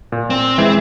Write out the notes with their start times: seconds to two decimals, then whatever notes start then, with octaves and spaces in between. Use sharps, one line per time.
0.12 A#2
0.30 C4
0.58 E3 G#3